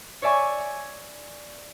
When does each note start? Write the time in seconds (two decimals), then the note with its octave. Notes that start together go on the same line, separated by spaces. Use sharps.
0.22 C#5 D5 E5 G#5 C#6